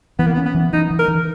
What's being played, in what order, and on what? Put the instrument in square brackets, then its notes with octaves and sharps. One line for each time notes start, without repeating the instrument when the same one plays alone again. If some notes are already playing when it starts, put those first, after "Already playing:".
[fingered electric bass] E3 [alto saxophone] B3
[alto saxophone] A#3
B3
[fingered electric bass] C#4
[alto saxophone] B3
[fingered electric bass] E3
[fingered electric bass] E3 [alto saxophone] D#4
[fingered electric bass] E3
[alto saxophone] A#4
[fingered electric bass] E3